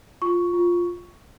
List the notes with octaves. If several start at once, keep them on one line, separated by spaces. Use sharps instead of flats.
F4 C#6
F4